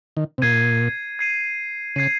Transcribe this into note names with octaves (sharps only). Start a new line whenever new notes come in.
D#3
C3
A#2 G#6 C7 D#7
G#6 C7 D#7
C#3 G#6 C7 D#7